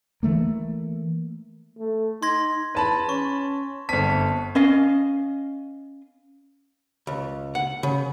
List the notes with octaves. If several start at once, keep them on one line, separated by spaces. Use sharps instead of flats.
E3 F#3 A3 A#3
A3
D#4 C6 G#6 A#6
E2 B4 A5 B5
C#4 C#6
G1 C4 A5 B6
C#4 D#5 F5
C#2
F#5
C#3